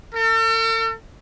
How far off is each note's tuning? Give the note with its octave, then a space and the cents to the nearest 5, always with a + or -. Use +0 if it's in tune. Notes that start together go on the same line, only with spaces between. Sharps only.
A4 +45